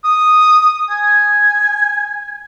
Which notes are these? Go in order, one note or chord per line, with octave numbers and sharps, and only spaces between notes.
D#6
G#5